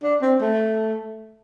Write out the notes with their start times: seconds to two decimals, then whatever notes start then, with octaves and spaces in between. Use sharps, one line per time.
0.03 D4
0.21 C4
0.41 A3